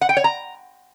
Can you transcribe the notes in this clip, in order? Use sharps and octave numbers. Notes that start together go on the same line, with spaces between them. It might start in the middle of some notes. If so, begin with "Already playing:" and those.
F#5
G5
C#5
A#5